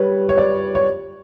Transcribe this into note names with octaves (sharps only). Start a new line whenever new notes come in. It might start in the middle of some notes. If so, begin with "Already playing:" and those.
Already playing: G3 B4 C#5
C#5
D5
C#5